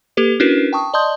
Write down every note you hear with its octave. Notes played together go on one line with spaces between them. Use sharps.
A#3 G4 A4 B4
C#4 D4 E4 F#4 A#4 B4
G5 A5 C#6 D#6
D5 D#5 A5 C6 D#6 G6